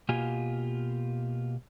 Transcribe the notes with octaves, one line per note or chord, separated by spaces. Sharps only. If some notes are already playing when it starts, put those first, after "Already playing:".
B2 A#3 F4 G4 G#5